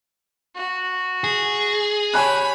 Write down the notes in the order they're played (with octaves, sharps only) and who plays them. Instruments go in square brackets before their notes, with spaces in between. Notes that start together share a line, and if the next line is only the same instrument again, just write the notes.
[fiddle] F#4
[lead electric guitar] G#4
[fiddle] G4 C#5 [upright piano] G#5 A5 F#6 [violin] B5